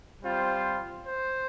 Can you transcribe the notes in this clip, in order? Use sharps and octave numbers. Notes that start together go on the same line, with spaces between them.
G3 C4 F4 C5
C5